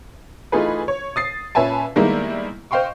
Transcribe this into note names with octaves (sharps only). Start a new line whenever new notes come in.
E3 A3 D#4 F4 G#4 B4
C#5
D#6 A6 C7
A#2 C#4 B4 E5 G#5 A5
D#3 G3 G#3 A#3 B3 E4
C5 D#5 F5 G5 C6 C#6